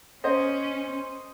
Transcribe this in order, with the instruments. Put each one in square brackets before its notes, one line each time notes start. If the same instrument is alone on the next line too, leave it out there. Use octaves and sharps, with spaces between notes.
[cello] C#4 [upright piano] C5 D#5